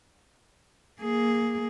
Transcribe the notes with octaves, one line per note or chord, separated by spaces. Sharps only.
A#3 G#4